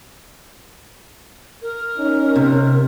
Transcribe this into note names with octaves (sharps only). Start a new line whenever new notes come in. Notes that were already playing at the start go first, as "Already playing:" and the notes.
A#4
C#4 D#4
C3